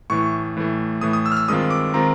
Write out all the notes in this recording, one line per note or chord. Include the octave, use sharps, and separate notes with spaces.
A2 E3 A3 C#6
A2 E3 A3
A2 E3 A3 D#6
D#6
E6
F6
E6
G2 D#3 G#3 C4 F4 D#6
D6
D#3 G#3 C4 F4 A#5